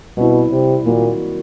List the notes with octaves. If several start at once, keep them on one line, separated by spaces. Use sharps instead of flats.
B2 G3 C4 E4
C3
A#2 D#3 F#3 A#3 D#4 F#4